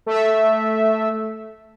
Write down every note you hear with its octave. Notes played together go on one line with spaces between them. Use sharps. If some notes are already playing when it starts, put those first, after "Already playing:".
A3 E5